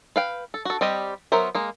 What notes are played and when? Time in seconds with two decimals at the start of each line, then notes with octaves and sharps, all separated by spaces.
0.16 B4 F5 G5
0.54 A4
0.65 F#4 A4
0.81 G3 C4 G4 D#5
1.32 F#3 B3 A#4 C5 E5
1.55 G#3 A#3